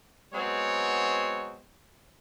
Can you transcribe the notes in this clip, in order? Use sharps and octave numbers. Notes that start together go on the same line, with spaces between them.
F#3 G#3 B3 C4 C#5